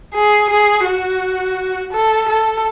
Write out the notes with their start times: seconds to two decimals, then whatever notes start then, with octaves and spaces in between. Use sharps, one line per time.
0.15 G#4
0.49 G#4
0.85 F#4
1.93 A4
2.28 A4